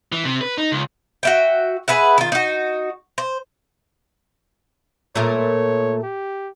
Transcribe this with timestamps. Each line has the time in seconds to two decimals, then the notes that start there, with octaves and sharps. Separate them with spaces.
0.12 E3
0.25 C3
0.41 B4
0.58 D#4
0.72 C#2
1.23 F#4 E5 G5
1.88 G#4 B4 E5 F#5
2.18 D#3 F4
2.32 D#4 F#4
3.18 C5
5.16 A#2 A3 A#4 C#5
6.03 G4